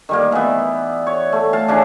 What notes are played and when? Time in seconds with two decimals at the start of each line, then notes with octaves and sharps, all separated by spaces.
0.09 D#3 G3 A#3
0.32 E3 B3
1.07 C#5
1.32 A3
1.53 F5 A5
1.68 C#3 E3 D4